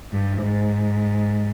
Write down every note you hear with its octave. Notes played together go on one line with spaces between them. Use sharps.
G2
G#2